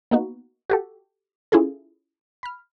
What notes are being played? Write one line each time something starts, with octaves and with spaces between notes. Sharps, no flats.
A#3 B3 D#4 F#4
F#4 G4 A4
C#4 E4 F4 G#4 A4
B5 F6